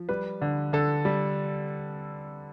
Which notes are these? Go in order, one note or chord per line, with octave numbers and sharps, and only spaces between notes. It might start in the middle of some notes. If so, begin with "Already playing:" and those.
Already playing: F3
G3 B4
D3
D3 A4
G3